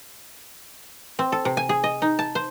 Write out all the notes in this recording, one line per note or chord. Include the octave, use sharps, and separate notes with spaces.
C4
A4
C3
G#5
G#4
D#5
D#4
A5
C5